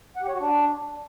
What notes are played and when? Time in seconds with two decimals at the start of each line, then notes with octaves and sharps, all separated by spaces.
0.16 F#5
0.22 G4
0.28 C#5
0.34 F#4
0.40 D4